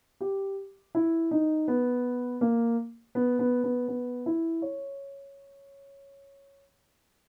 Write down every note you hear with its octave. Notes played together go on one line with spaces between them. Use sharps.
G4
E4
D#4
B3
A#3
B3
B3
B3
B3
E4
C#5